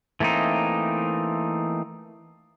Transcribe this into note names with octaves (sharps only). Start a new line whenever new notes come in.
E3 A3 A#3 C4 D#4